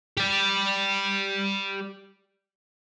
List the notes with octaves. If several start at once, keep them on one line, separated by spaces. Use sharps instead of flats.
G4 D5